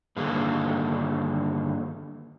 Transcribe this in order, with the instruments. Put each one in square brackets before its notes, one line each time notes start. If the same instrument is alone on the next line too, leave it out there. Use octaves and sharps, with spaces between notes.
[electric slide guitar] G2 D3 D#3 A#3 G#4 A4